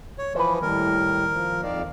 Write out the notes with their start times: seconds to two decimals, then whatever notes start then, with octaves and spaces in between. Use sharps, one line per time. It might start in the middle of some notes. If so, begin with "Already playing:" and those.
0.18 C#5
0.35 E3 F3 B4 C5
0.62 D#2 A2 G3 A#4
1.29 F3
1.63 F2 D#3 D5 F5